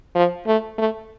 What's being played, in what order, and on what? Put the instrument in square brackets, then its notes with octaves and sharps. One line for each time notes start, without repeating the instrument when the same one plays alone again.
[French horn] F3
A3
A3